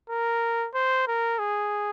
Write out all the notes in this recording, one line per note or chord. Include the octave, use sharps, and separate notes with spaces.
A#4
C5
A#4
G#4